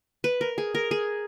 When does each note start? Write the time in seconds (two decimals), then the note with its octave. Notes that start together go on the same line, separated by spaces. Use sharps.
0.24 B4
0.41 A#4
0.58 G#4
0.75 A#4
0.91 G#4